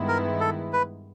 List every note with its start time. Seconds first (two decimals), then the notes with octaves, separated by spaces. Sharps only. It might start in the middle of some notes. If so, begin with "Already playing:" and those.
Already playing: G2 D#3 G#3 B3 E4
0.08 A#4
0.40 A4
0.73 B4